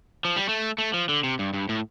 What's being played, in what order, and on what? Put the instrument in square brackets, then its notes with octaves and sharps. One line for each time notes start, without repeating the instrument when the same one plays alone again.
[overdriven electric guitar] F3
G3
A3
A3
F3
D3
C3
G2
G2
A2